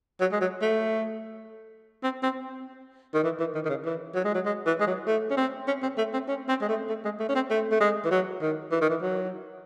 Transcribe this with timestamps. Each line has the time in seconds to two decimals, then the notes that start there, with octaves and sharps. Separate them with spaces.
0.20 F#3
0.32 G#3
0.41 F#3
0.61 A3
2.03 C4
2.23 C4
3.14 D#3
3.24 E3
3.40 E3
3.55 D#3
3.65 D#3
3.69 C#3
3.85 E3
4.15 F#3
4.25 G#3
4.35 F#3
4.46 G#3
4.66 E3
4.80 G#3
4.87 F#3
5.07 A3
5.30 C#4
5.37 C4
5.67 C#4
5.82 C4
5.98 A3
6.13 C4
6.28 C#4
6.49 C4
6.61 G#3
6.69 A3
6.89 A3
7.04 G#3
7.20 A3
7.29 C#4
7.35 C4
7.50 A3
7.71 A3
7.80 G#3
8.05 E3
8.11 F#3
8.42 D#3
8.71 E3
8.81 D#3
8.90 E3
9.02 F#3